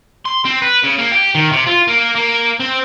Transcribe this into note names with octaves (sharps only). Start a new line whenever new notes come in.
C6
C4
B4
C#3
A#3
G4
D#3
C3
F4
A#3
A#3
C4